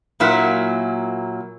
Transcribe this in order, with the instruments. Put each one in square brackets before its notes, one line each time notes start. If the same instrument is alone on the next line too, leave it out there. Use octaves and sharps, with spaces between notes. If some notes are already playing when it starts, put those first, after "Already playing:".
[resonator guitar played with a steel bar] A#2 F#3 A#3 E4